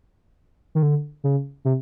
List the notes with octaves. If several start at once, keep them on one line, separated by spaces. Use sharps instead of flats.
D#3
D3
C#3
C3